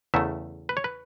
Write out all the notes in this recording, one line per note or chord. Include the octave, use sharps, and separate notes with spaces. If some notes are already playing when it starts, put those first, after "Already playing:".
E2 C#3 A3 E5
B4
C#5
B4